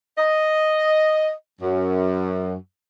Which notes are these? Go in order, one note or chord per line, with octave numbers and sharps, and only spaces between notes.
D#5
F#2